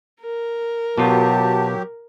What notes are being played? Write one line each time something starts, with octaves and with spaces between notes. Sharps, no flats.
A#4
B2 F#3 B3 F4 G4 A5